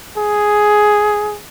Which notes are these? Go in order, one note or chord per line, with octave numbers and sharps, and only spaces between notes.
G#4